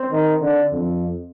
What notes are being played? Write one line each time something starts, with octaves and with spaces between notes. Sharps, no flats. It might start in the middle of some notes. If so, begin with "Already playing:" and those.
Already playing: C4
D#3
D3
F2